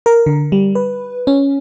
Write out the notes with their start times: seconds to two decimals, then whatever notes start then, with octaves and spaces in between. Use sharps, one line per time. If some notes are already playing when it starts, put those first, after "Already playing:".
0.06 A#4
0.26 D3
0.52 G3
0.75 B4
1.27 C#4